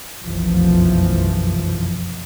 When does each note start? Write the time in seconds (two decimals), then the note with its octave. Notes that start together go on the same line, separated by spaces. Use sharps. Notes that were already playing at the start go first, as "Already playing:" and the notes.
0.23 F1 B1 F#2 E3 F3